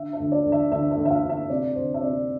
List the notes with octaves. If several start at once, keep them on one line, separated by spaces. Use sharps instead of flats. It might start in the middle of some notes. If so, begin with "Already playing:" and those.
Already playing: D3 E5
E5
D2
D5
D2
E5
D2 E5
E5
D2
E5
F5
D2
E5
C3 D5
D2 C5
E5
C3 D5